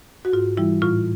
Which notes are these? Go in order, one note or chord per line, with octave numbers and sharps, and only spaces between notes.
F#4
G#2 F4
E3 G3 E4
A2 F4